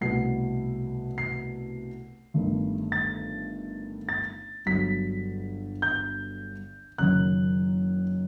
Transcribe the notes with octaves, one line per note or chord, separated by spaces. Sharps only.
C2 B2 A3 C7
C7
G1 G2 D#3 A3
A6
A6
G1 G2 F#3 B6
G6
F#1 F#2 D#3 F#6